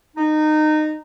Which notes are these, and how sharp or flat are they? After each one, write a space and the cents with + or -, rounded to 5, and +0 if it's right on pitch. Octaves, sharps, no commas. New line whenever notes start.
D#4 -20